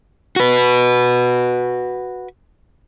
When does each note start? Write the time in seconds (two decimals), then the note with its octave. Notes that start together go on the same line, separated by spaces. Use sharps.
0.36 F#4 B4